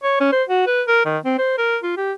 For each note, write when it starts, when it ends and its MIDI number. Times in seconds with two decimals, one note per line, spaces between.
0.03 0.18 73
0.20 0.31 61
0.32 0.43 72
0.49 0.67 66
0.67 0.82 71
0.87 1.03 70
1.05 1.17 51
1.25 1.33 60
1.38 1.53 72
1.58 1.77 70
1.83 1.95 65
1.97 2.12 67